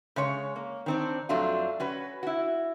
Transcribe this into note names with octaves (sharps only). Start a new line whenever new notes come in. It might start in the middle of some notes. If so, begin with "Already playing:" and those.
C#3 G#3 C#5
A#3
D#3 C4 D4
F2 F#3 G3 A3 D4 F4
C#4 F#4 B4
E4 F#4